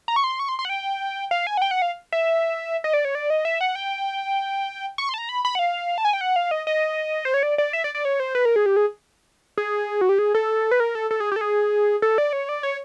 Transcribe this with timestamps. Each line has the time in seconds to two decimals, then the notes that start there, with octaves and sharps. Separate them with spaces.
0.08 A#5
0.16 C#6
0.24 C6
0.39 C#6
0.49 C6
0.59 C6
0.65 F#5
0.69 G5
1.31 F5
1.47 G#5
1.57 F#5
1.62 G5
1.71 F#5
1.82 F5
2.12 E5
2.84 D#5
2.94 D5
3.05 C#5
3.15 D5
3.30 D#5
3.45 E5
3.61 F#5
3.75 G5
4.98 C#6
5.09 C6
5.14 A5
5.18 A#5
5.29 B5
5.45 B5
5.55 F#5
5.59 F5
5.98 A5
6.05 G#5
6.13 G5
6.21 F#5
6.36 F5
6.51 D#5
6.67 D#5
7.25 C5
7.34 C#5
7.43 D5
7.58 D5
7.73 E5
7.84 D5
7.95 D5
8.05 C#5
8.20 C5
8.35 B4
8.45 A#4
8.56 G#4
8.66 G4
8.76 G#4
9.58 G#4
10.01 F#4
10.09 G4
10.19 G#4
10.34 A4
10.71 B4
10.80 A#4
10.95 A4
11.11 A4
11.20 G#4
11.32 G4
11.36 A4
11.41 G#4
12.02 A4
12.18 D5
12.33 C#5
12.49 D5
12.63 C#5